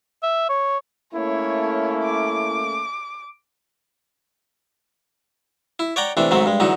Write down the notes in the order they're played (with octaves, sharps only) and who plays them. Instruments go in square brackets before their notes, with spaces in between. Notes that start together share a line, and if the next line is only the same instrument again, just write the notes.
[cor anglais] E5
C#5
[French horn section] A3 A#3 C#4 [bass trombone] E4 [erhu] C#5
[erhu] D6
[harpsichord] E4
C#5 D5 F#5 G5 A#5
C3 E3 A3 D4
G#2 D#3 F#3 A3 C4
G2 G#3
E2 D3 F#3 D#4